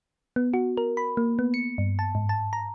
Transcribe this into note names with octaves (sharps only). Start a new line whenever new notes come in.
B3
F#4
A#4
B5
A#3
B3
C#7
G2
A5
G#2
A5
A#5